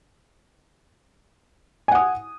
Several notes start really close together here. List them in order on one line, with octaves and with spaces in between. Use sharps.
G#5 F#5 D#6